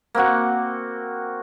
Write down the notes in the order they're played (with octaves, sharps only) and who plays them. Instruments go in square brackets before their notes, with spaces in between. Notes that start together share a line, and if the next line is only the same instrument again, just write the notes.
[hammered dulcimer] A#3 C4 F#4 F#5